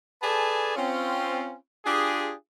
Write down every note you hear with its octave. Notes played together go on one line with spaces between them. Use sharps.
G#4 A4 B4 D5 G#5 A5
C4 C#4 F4
D4 F4 G4 G#4